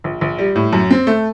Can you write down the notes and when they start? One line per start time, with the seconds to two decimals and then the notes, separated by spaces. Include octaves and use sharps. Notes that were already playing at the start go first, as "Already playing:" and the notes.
0.04 A#1
0.21 A#1
0.38 G3
0.56 A2
0.73 F#2
0.91 C4
1.07 A3